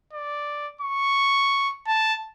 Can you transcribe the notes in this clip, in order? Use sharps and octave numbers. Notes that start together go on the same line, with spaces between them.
D5
C#6
A5